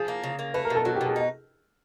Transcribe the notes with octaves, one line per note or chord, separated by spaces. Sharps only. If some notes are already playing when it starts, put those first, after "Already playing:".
Already playing: F3 G#4
A#3
C#3
A#3
A3 B4
A#4
B2 A4
F#3 F#4
G4
B2 G#4
D#4